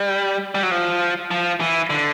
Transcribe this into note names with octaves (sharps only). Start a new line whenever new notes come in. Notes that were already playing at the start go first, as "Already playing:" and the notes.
Already playing: G3
G3
F#3
F3
F3
E3
D3